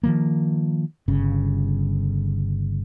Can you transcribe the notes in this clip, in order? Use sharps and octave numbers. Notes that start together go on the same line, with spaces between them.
D#3 F3 A#3
G1 C#3